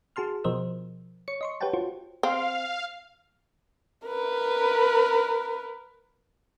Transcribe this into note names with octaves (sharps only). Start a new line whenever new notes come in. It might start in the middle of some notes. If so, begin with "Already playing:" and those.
F#4 G#4 A5 C6 F6
B2 F3 A#4 C5 D#5 E6
C#5 C#7
D#5 C6 C#6
G4 B4 C#5 F#5 G5 A5
F4 F#4 C5
C4 F5
A#4 B4